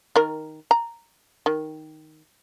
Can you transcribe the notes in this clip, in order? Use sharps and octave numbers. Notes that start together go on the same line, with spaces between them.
D#3 A#4
A#5
D#3